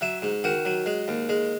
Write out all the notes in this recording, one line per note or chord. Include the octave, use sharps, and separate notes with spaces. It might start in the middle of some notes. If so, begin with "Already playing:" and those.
F#3 E5
G#2
D#3 F#4
F#3
G#3
D#2
G#3